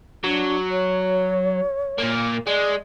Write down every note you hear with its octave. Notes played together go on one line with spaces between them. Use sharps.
F#3 D4
C#5
A#2 A#3
G#3 D5